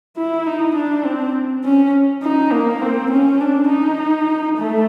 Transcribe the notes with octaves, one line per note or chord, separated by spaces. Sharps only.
E4
D#4
D4
C4
C#4
D#4
A#3
C4
C#4
D4
D#4
A3